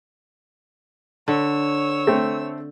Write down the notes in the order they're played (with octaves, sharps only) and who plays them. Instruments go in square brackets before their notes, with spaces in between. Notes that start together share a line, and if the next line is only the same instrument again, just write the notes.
[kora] D3 [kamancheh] C#5 E6
[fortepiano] A3 C4